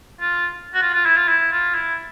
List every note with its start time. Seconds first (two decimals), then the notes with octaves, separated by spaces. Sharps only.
0.20 F4
0.74 F#4
0.82 F4
0.94 F4
1.05 E4
1.17 F4
1.28 E4
1.52 F4
1.74 E4